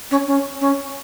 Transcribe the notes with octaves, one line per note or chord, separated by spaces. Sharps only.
C#4
C#4
C#4